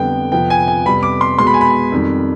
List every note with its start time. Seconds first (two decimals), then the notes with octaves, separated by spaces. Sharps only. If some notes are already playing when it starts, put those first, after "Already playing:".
Already playing: F2 D3 G3 B3 G5
0.32 F2 C3 F3 B3 G5
0.50 G#5
0.68 G#5
0.85 F2 C3 G3 B3 B5
1.03 D6
1.21 C6
1.39 B2 G#3 B3 C6
1.47 B5
1.54 G#5
1.61 B5
1.92 F2 D#3 G3